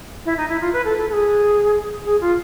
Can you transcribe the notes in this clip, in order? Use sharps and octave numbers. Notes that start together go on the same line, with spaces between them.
E4
D#4
E4
F4
B4
A4
A4
A4
G#4
G#4
F4